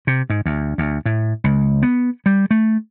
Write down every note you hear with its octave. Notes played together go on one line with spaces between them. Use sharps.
C3
G#2
D2
D2
A2
C#2
B3
G3
A3